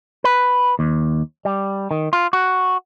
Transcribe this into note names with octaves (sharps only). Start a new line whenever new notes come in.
B4
D#2
G3
D#3
F4
F#4